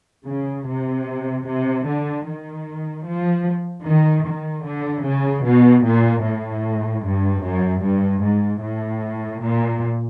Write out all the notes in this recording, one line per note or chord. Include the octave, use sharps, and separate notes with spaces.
C#3
C3
C3
D3
D#3
F3
D#3
D#3
D3
C#3
B2
A#2
A2
G2
F#2
G2
G#2
A2
A#2